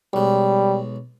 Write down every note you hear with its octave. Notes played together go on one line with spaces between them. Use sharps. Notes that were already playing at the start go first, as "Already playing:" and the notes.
B1 G3 G#3